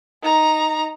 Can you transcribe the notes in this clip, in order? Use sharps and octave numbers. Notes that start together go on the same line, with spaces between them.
D#4 A#5